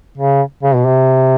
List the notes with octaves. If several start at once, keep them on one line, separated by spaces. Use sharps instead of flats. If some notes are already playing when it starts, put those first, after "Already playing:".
C#3
C#3
B2
C3